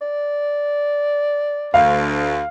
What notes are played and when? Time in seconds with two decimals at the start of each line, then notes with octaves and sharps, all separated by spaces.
0.01 D5
1.74 D2 F5